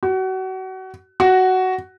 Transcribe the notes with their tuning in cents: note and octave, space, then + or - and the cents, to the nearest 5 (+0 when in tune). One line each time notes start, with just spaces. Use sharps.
F#4 +30
F#4 +10